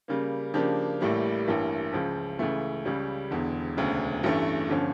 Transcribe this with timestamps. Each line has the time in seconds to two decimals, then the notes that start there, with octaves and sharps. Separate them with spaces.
0.08 C#3 G3 A#3
0.54 C#3 F3 A#3 D4 G4
1.01 A1 A2 G3 A#3
1.46 A1 G2 E3 A#3
1.92 C#2 C#3 F3
2.39 C#2 C#3 E3 A3
2.85 C#2 C#3 G3 C#4
3.31 E1 E2 D3
3.77 E1 D2 C#3
4.23 A1 G2 E3 A3 C#4
4.68 G1 D3 F3 C#4